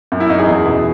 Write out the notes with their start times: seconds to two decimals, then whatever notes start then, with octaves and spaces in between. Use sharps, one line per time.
0.12 F#2
0.20 E4
0.29 F#2 D#4
0.39 G#4
0.47 E2
0.65 B2